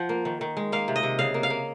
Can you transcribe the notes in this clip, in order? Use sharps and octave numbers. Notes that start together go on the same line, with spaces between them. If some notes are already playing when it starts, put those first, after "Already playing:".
Already playing: F3 F#5
A#3
D#3
D#3
G#3
A#3 F5
C3
D#5
C3
C#3 F5
A#3
F5
A#3